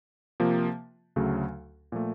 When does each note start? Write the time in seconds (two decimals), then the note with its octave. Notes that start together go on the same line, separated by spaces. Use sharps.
0.40 C3 F3 A#3
1.16 D2 C#3 F#3 A3
1.92 A#2 F3 A3